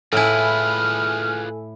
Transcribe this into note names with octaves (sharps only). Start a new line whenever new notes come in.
A2 E4 F4 G#4 A4 B4 G#5 F6